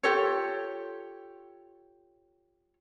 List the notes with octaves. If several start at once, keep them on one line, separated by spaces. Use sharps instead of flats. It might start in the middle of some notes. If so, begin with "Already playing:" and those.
F4 G4 A4 C#5